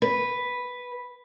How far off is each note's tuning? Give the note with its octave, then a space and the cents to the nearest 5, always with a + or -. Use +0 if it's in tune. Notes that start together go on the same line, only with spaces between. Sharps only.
B4 +0